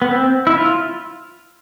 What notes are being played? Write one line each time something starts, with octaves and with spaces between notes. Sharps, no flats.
B3
C4
E4
F4